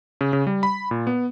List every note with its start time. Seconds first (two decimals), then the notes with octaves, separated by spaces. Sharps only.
0.21 C#3
0.33 C#3
0.47 G3
0.63 B5
0.91 A#2
1.07 B3